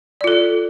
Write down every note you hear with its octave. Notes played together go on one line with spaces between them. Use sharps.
F4 A4 D5